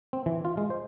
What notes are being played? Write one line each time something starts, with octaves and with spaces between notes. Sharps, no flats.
C4
E3
F4
G#3
C5